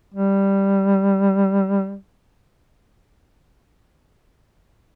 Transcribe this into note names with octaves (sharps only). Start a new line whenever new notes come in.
G3